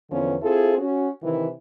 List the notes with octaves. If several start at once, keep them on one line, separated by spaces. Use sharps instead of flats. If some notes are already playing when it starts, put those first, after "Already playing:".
E2 D3 F3 B3 C#4
C4 E4 F4 G#4 A4
C#4 F#4
C3 D#3 E3